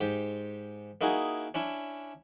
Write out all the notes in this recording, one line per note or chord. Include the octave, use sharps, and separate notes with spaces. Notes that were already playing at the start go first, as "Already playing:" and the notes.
G#2 G4
A#3 D#4 E4 F#4 G#4
C#4 D4 E4